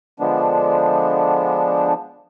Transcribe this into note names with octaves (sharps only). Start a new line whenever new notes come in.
D3 F3 G#3 B3 D4